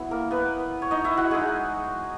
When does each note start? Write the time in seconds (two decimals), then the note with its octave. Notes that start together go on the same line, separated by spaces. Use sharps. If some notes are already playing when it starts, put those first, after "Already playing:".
Already playing: F#3 B3 E4
0.11 A#3 A#4
0.31 B3 B4
0.82 C#5
0.91 D#4 D#5
1.04 E4 E5
1.17 F#4 F#5
1.31 G#3 D#4 G#4 G#5